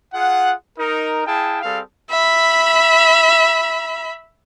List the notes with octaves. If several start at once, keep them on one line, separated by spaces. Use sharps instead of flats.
F4 G#4 F#5
D#4 A#4
E4 G#4 F5 G5 A5
G3 C4 G#4 A4 F5
E5 B5